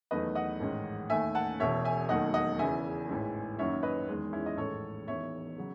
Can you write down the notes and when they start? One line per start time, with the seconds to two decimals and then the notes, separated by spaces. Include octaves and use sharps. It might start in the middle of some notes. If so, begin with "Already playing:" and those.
0.11 E2 D#3 F#3 A3 B4 D#5
0.35 D#5 F#5
0.60 A1 G#2 D#3
1.10 D#2 D#3 A3 E5 G#5
1.35 F#5 A5
1.60 E1 E2 B2 C#5 E5
1.85 E5 G#5
2.09 E1 D#2 D#3 F#3 A3 D#5 F#5
2.34 D#5 F#5
2.59 E2 C#3 E3 E5 G#5
3.09 A1 G#2 E3
3.58 F#1 F#2 D#3 F#3 C#5 E5
3.83 B4 D#5
4.08 E2 D#3 G#3
4.33 C#4 E4
4.46 D#5
4.57 A1 G#2 D#3 A3 A4 C#5
5.08 E1 E2 D#3 C#5 E5
5.58 C#3 F#3